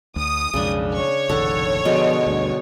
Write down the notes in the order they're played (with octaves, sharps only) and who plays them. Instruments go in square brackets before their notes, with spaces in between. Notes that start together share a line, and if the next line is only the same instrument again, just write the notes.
[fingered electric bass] D2 [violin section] D#6
[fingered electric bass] B1 F2 G#3 [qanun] C#3 D4
[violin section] C#5
[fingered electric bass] F1 A#1 D#3 [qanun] A4 F#5
[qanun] B2 D3 G#3 [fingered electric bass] F3 B3
[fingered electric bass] D2 G2